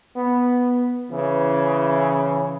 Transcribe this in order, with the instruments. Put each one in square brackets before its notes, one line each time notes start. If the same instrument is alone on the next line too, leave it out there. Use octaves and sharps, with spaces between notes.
[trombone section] B3
C#3 E3